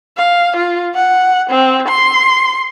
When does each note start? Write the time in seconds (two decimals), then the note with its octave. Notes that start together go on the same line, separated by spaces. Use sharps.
0.17 F5
0.57 F4
0.95 F#5
1.50 C4
1.88 C6